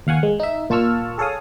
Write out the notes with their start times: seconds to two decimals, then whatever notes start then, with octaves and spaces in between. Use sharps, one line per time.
0.07 D#2 F5 F#5 G#5 C#6
0.23 G#3
0.40 D#4 E5
0.70 A#2 F4 A5 C#6 E6 F6
1.18 G#4 A4 C#5 F5 D#6